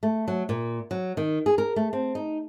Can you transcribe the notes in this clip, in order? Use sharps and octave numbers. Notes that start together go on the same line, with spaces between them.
A3
F#3
A#2
F#3
D#3
G#4
A#4
A3
C4
D#4